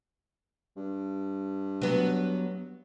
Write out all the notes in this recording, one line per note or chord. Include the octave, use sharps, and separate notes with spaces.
G2
F#3 B3